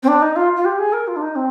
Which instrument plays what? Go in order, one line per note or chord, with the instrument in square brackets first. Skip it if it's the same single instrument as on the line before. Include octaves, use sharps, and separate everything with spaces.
[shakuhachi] C4
D4
D#4
F4
F4
G4
G#4
A#4
F4
D4
D#4
C4